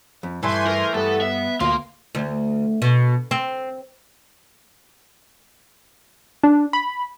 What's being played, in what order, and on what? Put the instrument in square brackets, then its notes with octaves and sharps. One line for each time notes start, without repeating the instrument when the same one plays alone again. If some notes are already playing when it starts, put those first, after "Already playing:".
[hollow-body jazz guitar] F2
[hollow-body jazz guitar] G2 [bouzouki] E3 A3 [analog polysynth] G#5 C6 G6
[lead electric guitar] A#4
[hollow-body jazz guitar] G2 [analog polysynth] B3 [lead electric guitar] A4
[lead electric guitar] E5
[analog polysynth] D2 [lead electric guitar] A#3 [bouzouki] F4
[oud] D2
B2
C4
[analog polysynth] D4
B5